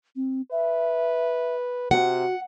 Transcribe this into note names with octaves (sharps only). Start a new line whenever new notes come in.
C4
B4 E5
C3 F#4 F#5